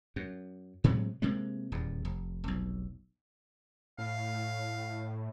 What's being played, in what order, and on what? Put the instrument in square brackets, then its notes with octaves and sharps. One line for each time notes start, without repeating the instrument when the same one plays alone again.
[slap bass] F#2
A2 C3 F#3 G#3
C3 G#3 A#3
D#1 E2
F1
F1 B1
[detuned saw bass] A2 [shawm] F5